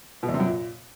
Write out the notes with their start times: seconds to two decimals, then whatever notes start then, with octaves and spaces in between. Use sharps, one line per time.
0.23 B2
0.28 E2
0.34 C3
0.40 F#2
0.45 A#2